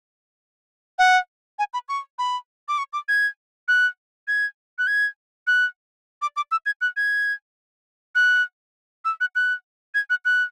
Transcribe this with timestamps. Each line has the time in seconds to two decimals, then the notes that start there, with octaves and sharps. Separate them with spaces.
0.99 F#5
1.59 G#5
1.74 B5
1.89 C#6
2.19 B5
2.68 D6
2.78 C#6
2.93 D6
3.08 G#6
3.68 F#6
4.28 G#6
4.78 F#6
4.87 G#6
5.47 F#6
6.22 D6
6.36 D6
6.51 E6
6.66 G#6
6.81 F#6
6.97 G#6
8.15 F#6
9.05 E6
9.21 F#6
9.36 F#6
9.95 G#6
10.10 F#6
10.25 F#6